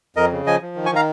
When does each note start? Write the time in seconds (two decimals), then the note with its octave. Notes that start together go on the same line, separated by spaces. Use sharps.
0.16 F2 A#4 D#5
0.32 C#3
0.46 F3 D#5 G#5
0.62 F3
0.76 D#3
0.86 G#5 C#6
0.91 D#3 F5 A#5